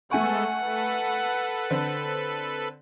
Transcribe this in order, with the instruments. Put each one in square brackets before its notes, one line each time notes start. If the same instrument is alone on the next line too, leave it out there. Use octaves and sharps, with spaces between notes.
[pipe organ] G#3 B3 A4 [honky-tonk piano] A3 G#5 C#6 [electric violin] F#5
[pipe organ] A4 B4
[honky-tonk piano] D3 C4